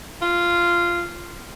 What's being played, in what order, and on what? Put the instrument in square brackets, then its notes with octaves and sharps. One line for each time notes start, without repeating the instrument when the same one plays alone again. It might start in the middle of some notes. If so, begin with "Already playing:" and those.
[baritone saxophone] F4